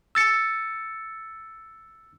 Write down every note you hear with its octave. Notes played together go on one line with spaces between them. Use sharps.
E6 A6 C#7